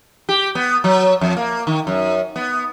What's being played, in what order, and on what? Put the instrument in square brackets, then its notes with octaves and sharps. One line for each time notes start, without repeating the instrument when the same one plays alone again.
[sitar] G4
B3
F#3
F2
A#3
D#3
F#2
B3